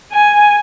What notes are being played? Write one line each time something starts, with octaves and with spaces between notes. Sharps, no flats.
G#5